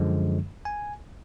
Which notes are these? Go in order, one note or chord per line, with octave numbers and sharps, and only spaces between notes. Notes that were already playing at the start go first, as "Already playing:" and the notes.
Already playing: F#2 D3 F3 G#3
G#5